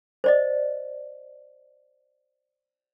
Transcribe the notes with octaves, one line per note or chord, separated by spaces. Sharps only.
C5 D5 D#5